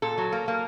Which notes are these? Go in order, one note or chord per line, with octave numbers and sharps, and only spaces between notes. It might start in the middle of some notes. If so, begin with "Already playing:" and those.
A#2 A4
F#3
A#3
A#3